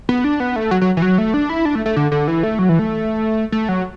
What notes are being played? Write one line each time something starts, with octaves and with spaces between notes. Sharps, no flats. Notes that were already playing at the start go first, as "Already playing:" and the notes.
B3
D4
B3
A3
F#3
F#3
E3
F#3
A3
D4
E4
D4
A3
A3
D3
D3
E3
A3
F#3
E3
A3
A3
F#3